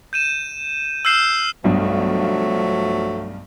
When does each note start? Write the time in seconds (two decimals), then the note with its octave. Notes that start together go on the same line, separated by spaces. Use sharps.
0.13 G6 D#7 E7
1.05 E6 F6 G6 C7 E7 G7
1.64 B1 G2 F3 F#3 A3